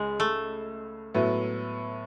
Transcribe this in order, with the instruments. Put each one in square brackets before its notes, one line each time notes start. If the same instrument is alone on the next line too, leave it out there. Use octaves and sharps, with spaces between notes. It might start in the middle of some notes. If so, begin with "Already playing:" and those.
Already playing: [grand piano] C#2 C#3 [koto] G#3
[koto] A3
[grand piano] A2 F#3 B3 E4